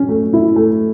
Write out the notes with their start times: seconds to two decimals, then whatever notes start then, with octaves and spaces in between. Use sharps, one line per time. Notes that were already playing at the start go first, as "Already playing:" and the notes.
Already playing: C#4
0.09 A3
0.33 E4
0.56 A3